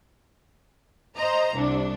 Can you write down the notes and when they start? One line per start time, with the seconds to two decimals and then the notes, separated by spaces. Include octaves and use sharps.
1.16 C5 D#5 A#5
1.55 C2 D4